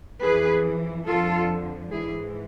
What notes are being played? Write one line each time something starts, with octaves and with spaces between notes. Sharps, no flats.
F2 E3 G#4 B4
F2 D3 F3 F4 A4
G#2 E3 E4 G#4